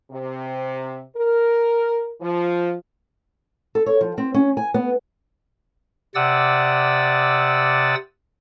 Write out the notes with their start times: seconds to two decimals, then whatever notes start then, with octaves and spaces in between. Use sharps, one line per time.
0.11 C3
1.16 A#4
2.21 F3
3.75 A4
3.86 C#5
4.01 F3
4.18 C4
4.34 C#4
4.57 G#5
4.74 B3
6.15 C3 D5 F#5 D#6 E6 A6